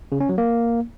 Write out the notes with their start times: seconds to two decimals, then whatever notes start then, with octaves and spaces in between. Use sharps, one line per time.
0.12 C#3
0.20 C#4
0.29 F#3
0.38 A#3